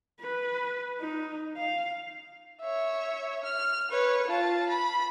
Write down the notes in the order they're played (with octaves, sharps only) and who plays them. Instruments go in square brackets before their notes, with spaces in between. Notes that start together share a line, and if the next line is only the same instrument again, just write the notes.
[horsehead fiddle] B4
D#4
F5
[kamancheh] C#5 E5
F6
B4 C#5
F4 A5
B5